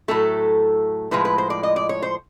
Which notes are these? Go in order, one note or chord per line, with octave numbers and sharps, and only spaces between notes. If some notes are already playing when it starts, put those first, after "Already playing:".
A2 F#3 A3 A4
A2 F3 G#3 B4
B4
C5
D5
D#5
D5
C#5
C5